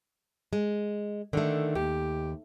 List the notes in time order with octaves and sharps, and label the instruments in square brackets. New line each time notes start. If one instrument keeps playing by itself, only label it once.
[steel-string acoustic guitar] G#3
[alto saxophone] D3 [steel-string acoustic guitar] D#3 A3
[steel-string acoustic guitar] D#2 [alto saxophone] G4